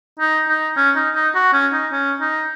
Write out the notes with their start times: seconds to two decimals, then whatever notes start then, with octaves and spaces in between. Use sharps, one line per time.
0.19 D#4
0.48 D#4
0.77 C#4
0.96 D#4
1.15 D#4
1.35 F#4
1.53 C#4
1.73 D#4
1.92 C#4
2.21 D#4